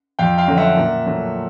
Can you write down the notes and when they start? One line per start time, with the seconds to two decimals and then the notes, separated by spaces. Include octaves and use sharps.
0.19 F2 F5 G5
0.38 F5 G5
0.48 D3 F#3 A3
0.57 E5 F#5
0.76 A#2
1.06 F#3 A3